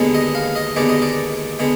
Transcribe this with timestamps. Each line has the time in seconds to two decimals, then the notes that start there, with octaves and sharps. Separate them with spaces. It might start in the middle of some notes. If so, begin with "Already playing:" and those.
Already playing: D#2 D3 G#3 B3
0.15 D#5
0.35 F5
0.56 D#5
0.76 D#2 D3 G#3 B3 D5
0.89 D#5
1.02 D5
1.59 D3 G#3 B3